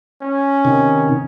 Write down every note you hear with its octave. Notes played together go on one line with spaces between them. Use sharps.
C#4
C3 D#3